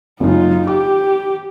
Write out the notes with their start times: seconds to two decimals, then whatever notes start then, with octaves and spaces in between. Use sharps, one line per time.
0.20 F#1 F#2 D#4 F4
0.67 G4 D6